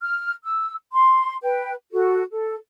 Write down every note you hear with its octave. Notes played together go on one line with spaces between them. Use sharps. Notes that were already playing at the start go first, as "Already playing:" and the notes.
F6
E6
C6
B4 G5
F#4 A4
A4